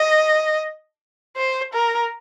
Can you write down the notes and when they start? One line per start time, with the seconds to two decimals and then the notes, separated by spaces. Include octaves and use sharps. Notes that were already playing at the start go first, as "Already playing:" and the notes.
Already playing: D#5
1.37 C5
1.73 A#4